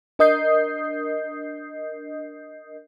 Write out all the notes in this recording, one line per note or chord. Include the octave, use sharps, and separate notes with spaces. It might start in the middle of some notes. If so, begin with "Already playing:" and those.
D4 A#4 D#5 D#6 G6 C7